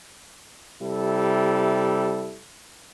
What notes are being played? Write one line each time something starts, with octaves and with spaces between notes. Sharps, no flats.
C3 G3 E4 A4